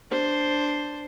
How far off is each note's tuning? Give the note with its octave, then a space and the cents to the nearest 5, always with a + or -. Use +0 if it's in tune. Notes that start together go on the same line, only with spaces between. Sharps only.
D4 +0 C5 +0